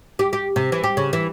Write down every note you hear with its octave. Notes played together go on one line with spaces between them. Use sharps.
G4
G4
C3
E3
G4
C#3
E3